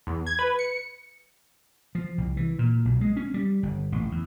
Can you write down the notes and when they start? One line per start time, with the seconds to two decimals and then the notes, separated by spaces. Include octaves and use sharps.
0.07 E2
0.27 G#6
0.39 B4
0.59 C#7
1.95 F3
2.18 C2
2.37 E3
2.59 A#2
2.85 B1
3.01 G#3
3.17 C#4
3.34 G3
3.63 G1
3.92 A1
4.11 E2